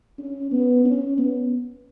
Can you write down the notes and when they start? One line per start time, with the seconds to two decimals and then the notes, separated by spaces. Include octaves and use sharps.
0.18 C#4
0.51 B3
0.85 C#4
1.18 B3